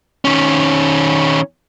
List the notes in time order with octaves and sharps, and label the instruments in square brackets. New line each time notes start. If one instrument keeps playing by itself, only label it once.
[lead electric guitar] D#3 C#4